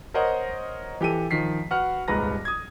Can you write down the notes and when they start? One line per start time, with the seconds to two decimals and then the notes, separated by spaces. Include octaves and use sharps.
0.14 A#4 C5 C#5 D#5 F#5 A#5
1.01 E3 G4 A4 D#7
1.31 D#3 F3 B6 C7
1.71 F#4 B4 F#5 F6
2.08 D#1 C2 G#2 B4 A#5 A#6
2.45 D#6 G#6